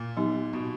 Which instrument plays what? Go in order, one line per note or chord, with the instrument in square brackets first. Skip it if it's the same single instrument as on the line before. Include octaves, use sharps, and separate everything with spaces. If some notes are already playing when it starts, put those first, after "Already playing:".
Already playing: [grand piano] A#2
[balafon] F#3 B3 D#4 G4
[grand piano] B2